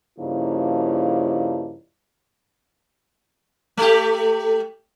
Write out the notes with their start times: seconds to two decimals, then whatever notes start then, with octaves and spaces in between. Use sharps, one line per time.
0.18 G2 C#3 F3 A#3 D#4 E4
3.77 A3 G4